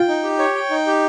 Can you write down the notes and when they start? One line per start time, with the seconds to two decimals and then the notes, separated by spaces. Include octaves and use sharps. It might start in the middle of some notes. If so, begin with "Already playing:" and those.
Already playing: F4 G5
0.08 D#4
0.24 G4
0.39 C#5
0.55 G5
0.70 D#4
0.87 G4